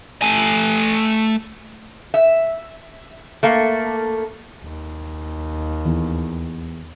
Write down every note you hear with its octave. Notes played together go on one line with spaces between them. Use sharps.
A3 G#5
E5
A3 A#3
D#2
E2